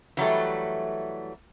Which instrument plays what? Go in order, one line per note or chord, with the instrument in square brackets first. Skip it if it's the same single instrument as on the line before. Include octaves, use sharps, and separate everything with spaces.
[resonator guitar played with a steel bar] E3 F#3 G3 A3